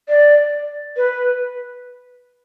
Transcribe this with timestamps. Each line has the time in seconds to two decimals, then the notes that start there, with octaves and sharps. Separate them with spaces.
0.08 D5
0.97 B4